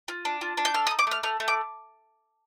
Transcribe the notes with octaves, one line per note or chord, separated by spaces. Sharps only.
F4
D4
F4
D4
G6
A4 F6
D#6
D#4
D6
A3 F6
A3 F6
A3
D6